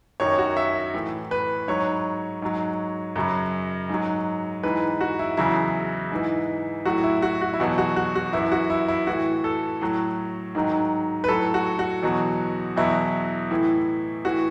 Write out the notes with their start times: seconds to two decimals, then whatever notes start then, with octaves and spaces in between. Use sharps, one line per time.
0.20 F#2 D#3 F#3 C#5
0.38 F#4
0.57 E5
0.94 A2 E3
1.31 B4
1.68 G#2 F#3 C#5
2.42 G#2 F#3
3.16 F#2 C#3 F#3
3.89 G#2 F#3
4.63 G#2 E3 B4
5.01 F#4
5.19 E4
5.37 E2 C#3 F#3 E4
6.12 G#2 E3
6.85 A2 F#3 F#4
7.04 E4
7.22 F#4
7.42 F#4
7.53 E4
7.59 E2 B2 F#3 F#4
7.78 F#4
7.96 F#4
8.15 F#4
8.33 F#2 E3 E4
8.52 F#4
8.70 E4
8.88 E4
9.07 A2 E3 F#4
9.44 A4
9.81 A2 F#3
10.55 G#2 D#3 F#3
11.24 B4
11.28 A2 F#3 A4
11.54 F#4
11.79 F#4
12.03 E2 B2 F#3
12.76 E2 B2 F#3 E4
13.51 A2 E3
14.25 A2 E3 F#4